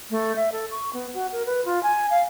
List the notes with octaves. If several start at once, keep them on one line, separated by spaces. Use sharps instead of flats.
A3
E5
A4
C#6
B3
F#4
A#4
B4
F4
G#5
F5